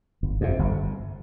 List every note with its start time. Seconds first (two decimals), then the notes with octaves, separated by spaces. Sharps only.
0.23 G1
0.41 F2 C3
0.59 G1